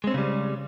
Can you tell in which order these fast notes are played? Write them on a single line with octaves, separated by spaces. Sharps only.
G#3 C4 C#4 C#3 G3